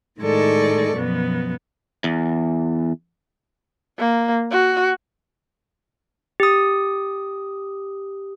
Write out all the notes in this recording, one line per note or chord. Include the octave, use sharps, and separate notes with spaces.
A2 D#3 G#3 A4 D5 C#6
F#2 B2 F3 B3
E2
A#3
F#4
G4 D#6